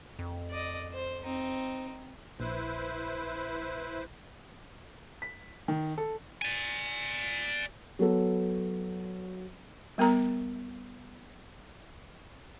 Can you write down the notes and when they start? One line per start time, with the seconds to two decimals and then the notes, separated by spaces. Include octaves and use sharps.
0.19 F2
0.50 D5 D#5
0.93 C5
1.24 C4 D#4
2.40 A#1 E4 B4 C5
5.22 B6
5.68 D#3
5.98 A4
6.42 D5 G#5
7.99 F#3 B3 A4
9.98 G3 B3 A#4 A#5